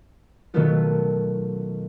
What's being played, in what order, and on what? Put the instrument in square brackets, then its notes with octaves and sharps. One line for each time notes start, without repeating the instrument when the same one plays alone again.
[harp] B2 D#3 F#3 A3 B3 F4